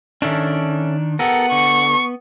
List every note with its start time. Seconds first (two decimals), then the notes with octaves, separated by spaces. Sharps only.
0.22 D#3 C#4 D4 A4 E5
1.19 B3 G4 A4 A#4 F#5
1.52 D3 C#6